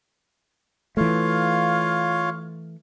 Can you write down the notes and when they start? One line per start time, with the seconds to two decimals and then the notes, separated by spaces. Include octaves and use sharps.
0.97 E3 A3 F4 C#5 F5